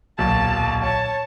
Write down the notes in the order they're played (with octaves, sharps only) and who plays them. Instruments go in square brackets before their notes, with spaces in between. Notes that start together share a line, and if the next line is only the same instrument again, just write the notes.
[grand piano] D1 B1 A#2 [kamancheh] A5
[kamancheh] C#5 A5